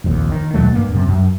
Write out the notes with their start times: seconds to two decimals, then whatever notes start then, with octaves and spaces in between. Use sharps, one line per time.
0.04 F1 A#1 D#2
0.32 D#3
0.54 D#2 B2 F#3 A3
0.73 G2 A#3 B3
0.91 F#2 C3
1.08 F#2